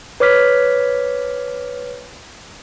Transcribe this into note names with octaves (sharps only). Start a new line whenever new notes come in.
B4 C#5 D6 F6 B6